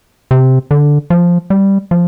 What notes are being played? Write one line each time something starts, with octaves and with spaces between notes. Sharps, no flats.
C3
D3
F3
G3
F3